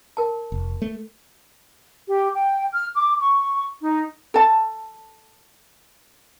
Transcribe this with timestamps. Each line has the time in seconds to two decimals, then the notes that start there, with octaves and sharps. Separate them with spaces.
0.17 A#4 A5
0.52 F1
0.82 A3
2.08 G4
2.36 G5
2.73 F6
2.95 D6
3.20 C#6
3.83 D#4
4.34 A4 A5